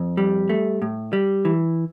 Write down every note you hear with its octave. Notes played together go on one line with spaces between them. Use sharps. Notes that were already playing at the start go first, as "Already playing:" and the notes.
Already playing: F2
G3
A3
A2
G3
E3